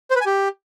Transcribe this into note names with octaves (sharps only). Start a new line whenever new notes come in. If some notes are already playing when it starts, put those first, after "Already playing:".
C5
B4
G#5
G4